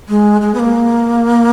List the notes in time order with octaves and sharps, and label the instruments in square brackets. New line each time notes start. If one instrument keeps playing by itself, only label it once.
[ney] G#3
G#3
B3
A#3